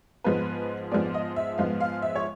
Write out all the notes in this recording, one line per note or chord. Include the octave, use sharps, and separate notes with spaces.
G#2 F3 G#3 B3 B4
G#2 F3 G#3 B3 D5
D#5
E5
G#2 F3 G#3 B3 F5
F5
E5
C#5